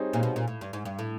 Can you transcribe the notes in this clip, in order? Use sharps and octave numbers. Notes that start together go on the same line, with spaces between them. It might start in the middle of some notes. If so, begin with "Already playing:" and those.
Already playing: G3 C4 D#4 G#4 C#5
A#2
B2
A#2
A2
G2
G#2
G2
A2